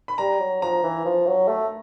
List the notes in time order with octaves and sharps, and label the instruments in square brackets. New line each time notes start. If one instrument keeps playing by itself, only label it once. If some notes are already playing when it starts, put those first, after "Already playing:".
[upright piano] B5
[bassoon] G3 [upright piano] A#5
[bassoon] F#3
[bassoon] F3 [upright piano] A#5
[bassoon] E3
F3
F#3
A3